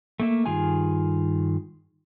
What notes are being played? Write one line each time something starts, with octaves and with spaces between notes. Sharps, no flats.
A3 A#3 E5
G2 D#3 F4 G#4 G#5